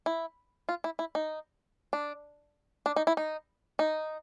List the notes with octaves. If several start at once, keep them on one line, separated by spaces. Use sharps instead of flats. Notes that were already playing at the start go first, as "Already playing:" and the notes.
E4
F4
E4
E4
D#4
D4
D4
D#4
E4
D#4
D#4